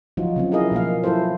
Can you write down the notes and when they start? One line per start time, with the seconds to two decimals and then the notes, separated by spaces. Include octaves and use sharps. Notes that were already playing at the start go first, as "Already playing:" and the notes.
0.17 F3 F#3 D#4 F4 F#4
0.36 C#3 F#3 C4
0.52 D#4 E4 G#4 A#4 D#5 F5
0.71 B2 F3 A#3 F5
1.04 F#3 E4 F4 A4 C5